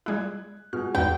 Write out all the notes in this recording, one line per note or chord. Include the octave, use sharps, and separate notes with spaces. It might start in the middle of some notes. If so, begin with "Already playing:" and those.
G3 G#3 E4 F#6 G#6
B2 G#3 F6
E2 G#2 B4 G5